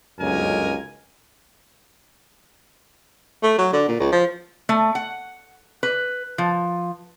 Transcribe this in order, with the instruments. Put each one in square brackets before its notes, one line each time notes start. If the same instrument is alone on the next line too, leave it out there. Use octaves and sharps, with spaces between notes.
[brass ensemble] G1 C#2 F#2 D#4 A#4 G#5
[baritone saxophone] A3
F#3
D3
A#2
C#2
F3
[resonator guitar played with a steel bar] A3
F#5
B4
F3